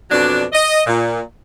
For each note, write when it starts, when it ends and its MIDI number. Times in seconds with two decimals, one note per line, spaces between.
0.10 0.44 41
0.10 0.44 47
0.10 0.44 54
0.10 0.44 62
0.53 0.81 75
0.87 1.20 46